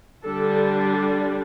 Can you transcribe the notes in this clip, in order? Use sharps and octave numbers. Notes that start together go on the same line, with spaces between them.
D3 G3 D4 A4